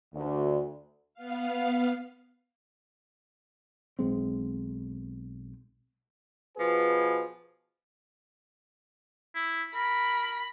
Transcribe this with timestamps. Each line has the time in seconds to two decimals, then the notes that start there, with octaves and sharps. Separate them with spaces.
0.14 D2
1.14 B3 F5
3.99 B1 G#3 C4
6.57 B2 F3 G#4 B4
9.35 E4
9.75 A#4 B5